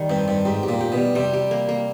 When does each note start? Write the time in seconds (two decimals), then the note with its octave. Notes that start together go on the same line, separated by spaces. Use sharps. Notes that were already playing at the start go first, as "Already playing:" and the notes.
Already playing: D#3 G3
0.09 G2 C4
0.27 G2 D#3
0.45 G#2 G4
0.63 G4
0.69 A#2
0.81 G4
0.92 B2
0.97 G3
1.15 C3 G3
1.33 G4
1.51 A#3
1.69 A#3